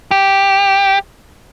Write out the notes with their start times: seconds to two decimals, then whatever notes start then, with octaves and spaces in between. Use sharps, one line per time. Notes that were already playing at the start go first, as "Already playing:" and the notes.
0.11 G4